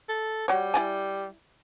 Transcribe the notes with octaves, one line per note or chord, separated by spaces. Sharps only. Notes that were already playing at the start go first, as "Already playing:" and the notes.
A4
G3 F#4 C#5
E4 D5 G#5